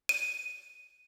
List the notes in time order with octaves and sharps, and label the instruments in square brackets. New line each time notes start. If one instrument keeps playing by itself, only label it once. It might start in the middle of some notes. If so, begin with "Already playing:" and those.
[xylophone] D#7